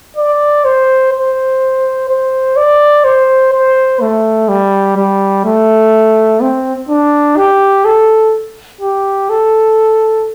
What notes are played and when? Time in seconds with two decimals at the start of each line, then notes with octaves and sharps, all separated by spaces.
0.17 D5
0.65 C5
1.12 C5
2.09 C5
2.57 D5
3.05 C5
3.53 C5
4.01 A3
4.49 G3
4.97 G3
5.45 A3
6.41 C4
6.89 D4
7.37 G4
7.85 A4
8.81 G4
9.30 A4